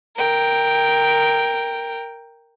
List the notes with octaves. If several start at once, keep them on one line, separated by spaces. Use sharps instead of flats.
A#4 G5